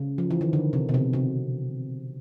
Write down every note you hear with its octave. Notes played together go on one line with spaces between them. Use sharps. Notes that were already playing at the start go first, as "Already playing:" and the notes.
Already playing: C#3
F3
E3
D#3
D3
C3
B2
C3
C3